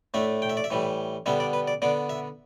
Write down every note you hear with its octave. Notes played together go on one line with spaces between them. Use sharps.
A2 A3 D4 E5
G5
E5
D5
E5
A2 E3 G3
D3 G3 B3 D4 E5
D5
B4
D5
D3 B3 D4 D5
E5